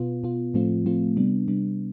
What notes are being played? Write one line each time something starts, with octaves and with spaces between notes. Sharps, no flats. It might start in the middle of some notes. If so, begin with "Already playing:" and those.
Already playing: B2 B3 F4
B2 B3 F4
A2 F3 A3 C4 F4
A2 F3 A3 C4 F4
C3 G3 B3 D4
C3 G3 B3 D4